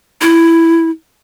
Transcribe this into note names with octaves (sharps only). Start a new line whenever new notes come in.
E4